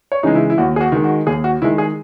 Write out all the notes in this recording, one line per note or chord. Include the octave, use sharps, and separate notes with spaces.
C#5
C#3 E3 G#3 D#4
E4
E4
D#2 F#4
G#4
F#4
D#3 G#3
F#4
D#2 G#4
F#4
D#3 G#3 E4
G#4